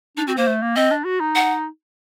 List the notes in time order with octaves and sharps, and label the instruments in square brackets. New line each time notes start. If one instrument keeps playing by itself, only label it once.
[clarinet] D4 [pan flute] D#4
[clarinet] C4 [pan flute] F#4
[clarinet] A#3 [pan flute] C5
[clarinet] A3
A#3
[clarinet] C4 [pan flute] D#5
[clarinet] D4
F#4
D#4
[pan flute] F#5